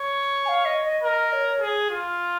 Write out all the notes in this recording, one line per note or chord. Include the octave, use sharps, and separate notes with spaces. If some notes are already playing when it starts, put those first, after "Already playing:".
Already playing: C#5
G#5
F5
D#5
D#5
A#4 D#5
C#5
G#4
F4